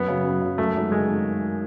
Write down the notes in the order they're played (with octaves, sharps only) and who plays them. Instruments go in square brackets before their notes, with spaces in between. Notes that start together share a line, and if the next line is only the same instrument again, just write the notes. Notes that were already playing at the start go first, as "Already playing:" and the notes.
Already playing: [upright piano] F#2 [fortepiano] B3
[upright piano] C#3 F#3
F#2
C#3 F#3
[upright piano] F#2 [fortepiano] A3
[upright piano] D#3 G#3 C#4 F#4
[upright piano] F#2 [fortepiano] G#3
[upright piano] D#3